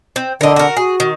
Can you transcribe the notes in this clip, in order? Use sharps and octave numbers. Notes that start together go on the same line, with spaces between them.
C4
D3 A#4 D#5
F#4 A#4
F#4 G#4
D#3